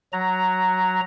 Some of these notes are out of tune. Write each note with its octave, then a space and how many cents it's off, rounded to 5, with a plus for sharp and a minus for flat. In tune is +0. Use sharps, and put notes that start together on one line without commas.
F#3 +0 A#5 +0